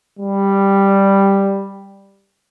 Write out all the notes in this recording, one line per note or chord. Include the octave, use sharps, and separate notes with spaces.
G3